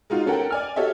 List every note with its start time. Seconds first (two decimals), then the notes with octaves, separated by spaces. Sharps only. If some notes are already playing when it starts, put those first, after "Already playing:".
0.10 G#3 D#4 F4 F#4
0.26 C#4 A4 A#4 F#5 G5
0.50 D5 G#5 F6
0.76 F#4 G4 A4 C#5 D#5 E5